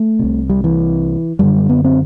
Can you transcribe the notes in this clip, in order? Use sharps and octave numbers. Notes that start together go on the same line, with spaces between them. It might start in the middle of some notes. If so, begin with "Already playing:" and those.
Already playing: A3
C2 C3
G3
E3
F#2 D3 G3
B3
C4